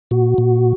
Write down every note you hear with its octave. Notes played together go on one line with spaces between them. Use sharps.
A#2 F#4
A#2